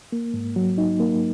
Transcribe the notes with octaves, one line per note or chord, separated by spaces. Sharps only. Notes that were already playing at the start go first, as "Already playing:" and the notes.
A#3
G#2
F#3
D#4
A#3